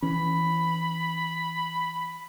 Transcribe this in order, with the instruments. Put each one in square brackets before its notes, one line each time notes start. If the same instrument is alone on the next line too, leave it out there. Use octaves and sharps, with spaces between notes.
[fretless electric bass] E3 C#4 [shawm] B5